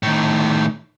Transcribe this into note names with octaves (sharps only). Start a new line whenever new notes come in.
A2 D#3